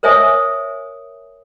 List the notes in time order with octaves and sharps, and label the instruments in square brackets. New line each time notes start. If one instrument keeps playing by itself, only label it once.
[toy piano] A#4 C5 C#5 E5 G#5 D#6